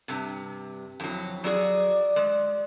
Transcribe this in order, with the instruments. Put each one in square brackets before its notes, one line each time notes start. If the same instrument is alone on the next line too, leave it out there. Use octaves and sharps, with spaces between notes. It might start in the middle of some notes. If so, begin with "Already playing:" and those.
[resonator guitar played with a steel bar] G2 C3
[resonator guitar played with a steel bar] F2 F#3 [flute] E4
[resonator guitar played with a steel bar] F#3 F#4 G#4 [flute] D5
[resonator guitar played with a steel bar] G#3